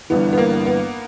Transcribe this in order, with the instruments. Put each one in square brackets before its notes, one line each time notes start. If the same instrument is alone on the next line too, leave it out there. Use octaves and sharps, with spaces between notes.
[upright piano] G1 G2 E3 [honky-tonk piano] B3
[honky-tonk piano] B3
A#3
B3